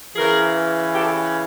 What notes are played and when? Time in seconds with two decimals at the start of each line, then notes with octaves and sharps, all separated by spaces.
0.15 C#3 E3 G#4 A#4
0.93 G4 A4